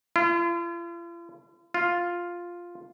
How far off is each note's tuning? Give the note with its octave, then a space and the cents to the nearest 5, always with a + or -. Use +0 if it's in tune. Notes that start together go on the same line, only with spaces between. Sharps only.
F4 -45
F4 +0